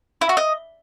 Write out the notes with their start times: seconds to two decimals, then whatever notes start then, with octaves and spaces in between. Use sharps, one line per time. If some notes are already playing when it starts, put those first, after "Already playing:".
0.21 E4
0.29 F#4
0.37 D#5